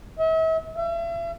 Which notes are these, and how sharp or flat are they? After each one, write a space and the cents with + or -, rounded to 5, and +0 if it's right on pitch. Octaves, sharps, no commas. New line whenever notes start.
E5 -40
E5 +40